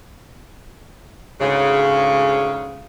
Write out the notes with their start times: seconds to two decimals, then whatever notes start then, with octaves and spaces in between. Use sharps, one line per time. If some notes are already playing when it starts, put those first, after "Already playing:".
1.40 D2 G#2 C#3